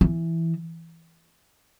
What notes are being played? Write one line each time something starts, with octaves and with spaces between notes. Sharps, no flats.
E3